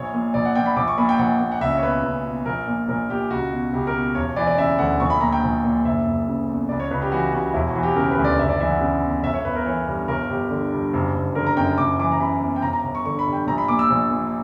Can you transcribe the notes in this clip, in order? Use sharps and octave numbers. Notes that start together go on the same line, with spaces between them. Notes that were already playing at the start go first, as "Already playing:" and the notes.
Already playing: A#1 C#5
A#2
A#1 D5
F#5
A#2 G5
B5
A#1 D6
C#6
A#2 B5
G5
A#1 F#5
A#2
F#5
C#2 E5
C#5
B2 B4
C#2
B2
A#1 A#4
A#2
A#1 A#4
A#2 G4
C#2 F#4
B2
C#2 G4
A#4
B2
E1 C#5
E3 D5
D5
C#3 E5
D2 F#5
A#1 C#6
B5
A#2 A#5
G5
A#1
A#2
F#1 E5
F#1
C#3
E2
C#2 D5
C#5
C#2 B4
G4
E3 F#4
C#3 F#4
E1 E4
F#4
E3
G4
C#3 A#4
B4
D2
D5
F#1 E5
D5
E3 E5
F#5
C#3
E2
G1 E5
C#5
G1 B4
A#4
E3 C#5
G2
G1 A#4
G1 G4
D3
G2
F#1
F#1
D3 A#4
A#5
F#2 G5
F#1 D6
E3 D6
A#5
C#3 B5
E2
G5
G1 A#5
A#5
G1
C#6
D3 C#6
B5
G2
G5
A#1 A#5
B5
A#2 D6
E6
A#1
A#2